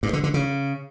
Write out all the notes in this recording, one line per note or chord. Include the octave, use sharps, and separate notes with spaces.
G2
D3
D3
C#3